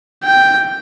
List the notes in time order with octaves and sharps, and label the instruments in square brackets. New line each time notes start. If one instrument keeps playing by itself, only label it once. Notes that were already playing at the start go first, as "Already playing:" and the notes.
[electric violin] G5